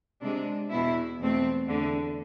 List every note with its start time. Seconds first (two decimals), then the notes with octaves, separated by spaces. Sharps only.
0.22 C3 G#3 D4
0.70 E2 B2 B3 E4
1.19 E2 B2 A3 C4
1.67 E2 D3 A3